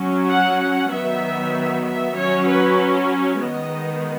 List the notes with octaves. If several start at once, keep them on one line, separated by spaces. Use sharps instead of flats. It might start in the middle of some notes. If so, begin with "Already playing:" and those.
Already playing: F#3 C#4
F#5
F#5
D#3 F#3 B3 E5
E5
F#3 C#4 C#5
B4
D#3 G#3 B3 D#5